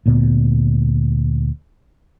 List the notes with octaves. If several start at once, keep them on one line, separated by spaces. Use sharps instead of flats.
D2 A#2 B3